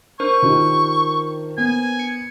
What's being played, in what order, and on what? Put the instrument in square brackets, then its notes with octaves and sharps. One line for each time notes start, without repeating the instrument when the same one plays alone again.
[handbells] D4 A#4 C5 [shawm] C#6
[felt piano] D#3 F4 G4
[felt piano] B3 [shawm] G#5
[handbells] C#7